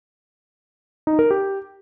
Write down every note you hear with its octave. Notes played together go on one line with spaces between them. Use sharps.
D#4
A#4
G4